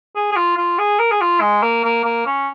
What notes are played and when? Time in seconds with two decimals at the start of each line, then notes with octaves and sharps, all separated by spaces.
0.16 G#4
0.32 G#4
0.36 F4
0.57 F4
0.79 G#4
0.99 A#4
1.12 G#4
1.21 F4
1.41 G#3
1.63 A#3
1.84 A#3
2.04 A#3
2.27 C#4